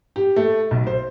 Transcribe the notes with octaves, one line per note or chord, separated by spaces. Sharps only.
G4
A3
B1
C5